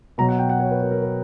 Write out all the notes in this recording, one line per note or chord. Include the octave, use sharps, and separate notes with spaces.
B2 F#3 A#5
F#5
G5
F#5
C#5
B4
A#4
A#4
B4